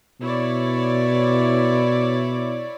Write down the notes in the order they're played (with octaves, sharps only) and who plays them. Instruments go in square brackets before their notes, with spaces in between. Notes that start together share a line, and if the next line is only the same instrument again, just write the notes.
[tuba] B2 [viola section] E4 C#5 D5